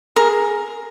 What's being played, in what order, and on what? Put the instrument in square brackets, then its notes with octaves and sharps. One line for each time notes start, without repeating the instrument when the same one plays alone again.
[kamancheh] G#4 [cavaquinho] A#4